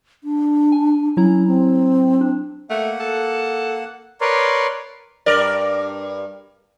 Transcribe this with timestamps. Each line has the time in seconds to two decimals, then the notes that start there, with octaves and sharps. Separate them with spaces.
0.24 D4
0.72 G#5
1.17 F#3 C#4 E4 A#5
1.47 C4
2.21 D4
2.70 A3 A#3 F#5
3.00 A4
4.21 A#4 B4 C#5 D5 C6
5.26 G2 A#4 D5